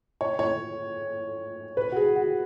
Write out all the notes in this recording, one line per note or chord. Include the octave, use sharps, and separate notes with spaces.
C#5
C#5
B4
F#4
G#4
F#4